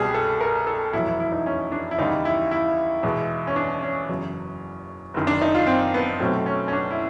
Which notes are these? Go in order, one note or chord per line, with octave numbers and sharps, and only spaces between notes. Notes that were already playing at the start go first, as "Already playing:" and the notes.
Already playing: C2 B2 G3 G#4
A4
A#4
A4
F1 E2 B2 F#3 E4
E4
E4
D#4
C#4
D4
E4
D#2 C#3 E3 G3 D#4
E4
E4
E2 B2 G#3
C#4
D4
C#4
F#1 E2 C#3 F#3
F#1 F#2 D#3
D4
D#4
F4
C4
B3
B1 B2 F#3 A3 C4
C#4
C#4
D4
E4